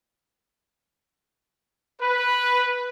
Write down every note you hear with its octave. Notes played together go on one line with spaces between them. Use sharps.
B4